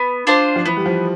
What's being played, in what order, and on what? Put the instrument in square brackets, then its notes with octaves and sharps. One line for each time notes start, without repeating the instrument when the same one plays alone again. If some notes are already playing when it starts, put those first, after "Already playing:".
Already playing: [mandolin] B3
D4 F4 C5
[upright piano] F3
[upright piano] E3 [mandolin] B3
[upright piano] G3
F3